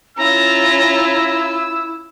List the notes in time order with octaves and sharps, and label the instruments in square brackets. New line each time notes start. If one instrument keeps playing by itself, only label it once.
[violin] C#4 F4 [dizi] E4 [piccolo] A#5 [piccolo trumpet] E6